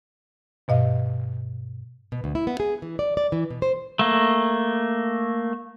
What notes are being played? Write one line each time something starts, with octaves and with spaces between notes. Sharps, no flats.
G2 B2 D#5 F5
B2
D2
E4
B3
G#4
E3
D5
D5
E3
B2
C5
A3 A#3